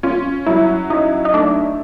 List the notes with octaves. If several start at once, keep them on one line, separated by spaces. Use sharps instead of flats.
C#4 F4
F#3 E4
D#4 E4
D#4
A3 D4